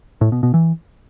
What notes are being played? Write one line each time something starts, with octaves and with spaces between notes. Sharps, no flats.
A2
B2
B2
E3